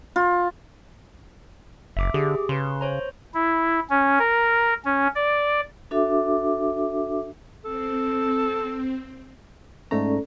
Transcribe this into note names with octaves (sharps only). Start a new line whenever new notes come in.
F4
F#1 E5 D6
D3 G4 G#4 D6
C#3 B4 C6
C5 C#5 A#5
E4
C#4
A#4
C#4
D5
D4 F#4 A4 E5 D6
C4 A4
G#2 A3 C#4 A4 D5 A#5